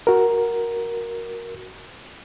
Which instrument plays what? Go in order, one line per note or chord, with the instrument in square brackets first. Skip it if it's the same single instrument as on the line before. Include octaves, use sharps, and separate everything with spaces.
[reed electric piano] F#4 A#4